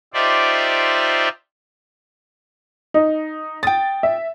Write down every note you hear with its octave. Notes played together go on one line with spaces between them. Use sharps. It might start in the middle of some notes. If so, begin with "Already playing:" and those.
D#4 F4 G4 C5 D5 E5
D#4
G5 D#6 A6
E5